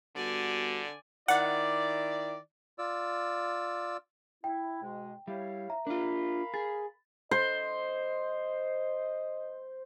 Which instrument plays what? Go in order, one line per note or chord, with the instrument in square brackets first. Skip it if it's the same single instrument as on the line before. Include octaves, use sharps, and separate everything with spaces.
[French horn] D3 [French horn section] G3 B3 F#4 [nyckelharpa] D5 G#5
[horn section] D#3 E4 D5 [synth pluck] F#5
[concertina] F4 D5 E6
[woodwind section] E4 [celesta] G5
[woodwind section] G#2 B2 G#3
[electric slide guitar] G3 [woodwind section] E4 C#5 F5
[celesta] E5 A#5
[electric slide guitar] D4 F4 [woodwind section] A#4 F5 B5
[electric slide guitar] G#4 [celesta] A6
[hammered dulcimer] C5 [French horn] D#5